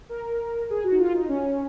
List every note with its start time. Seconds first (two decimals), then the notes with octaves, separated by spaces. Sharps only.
0.09 A#4
0.70 G#4
0.84 F#4
0.91 D#4
0.99 F4
1.14 D#4
1.28 C#4